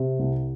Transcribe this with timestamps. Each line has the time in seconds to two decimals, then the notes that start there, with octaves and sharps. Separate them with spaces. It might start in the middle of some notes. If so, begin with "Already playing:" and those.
Already playing: C3
0.19 C2